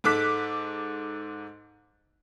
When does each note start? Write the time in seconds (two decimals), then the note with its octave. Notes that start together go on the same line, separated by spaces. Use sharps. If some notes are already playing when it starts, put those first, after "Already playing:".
0.04 G#2 A4 D6 F#6 B6